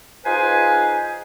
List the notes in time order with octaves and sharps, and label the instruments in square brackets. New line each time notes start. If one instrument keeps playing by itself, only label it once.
[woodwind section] D#4 F4 G#4 B4 C5 G#5